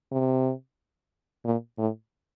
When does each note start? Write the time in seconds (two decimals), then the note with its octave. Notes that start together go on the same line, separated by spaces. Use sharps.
0.12 C3
1.45 A#2
1.78 A2